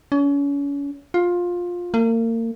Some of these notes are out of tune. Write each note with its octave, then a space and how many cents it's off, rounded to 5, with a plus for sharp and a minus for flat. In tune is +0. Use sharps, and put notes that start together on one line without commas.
C#4 +35
F4 +15
A#3 -35